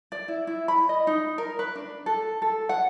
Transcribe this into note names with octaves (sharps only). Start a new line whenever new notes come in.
D5
E4
E4
B5
D#5
D#4
A#4
B4
D4
A4
A4
F#5